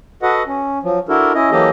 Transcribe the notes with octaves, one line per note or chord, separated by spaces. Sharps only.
F#4 A4 B4 D#5 F#5
C#4
F3 F#3
D4 E4 F#4 A4 A#4
C#4 E4 D#5
E3 F#3 A#3 G4 A4 D#5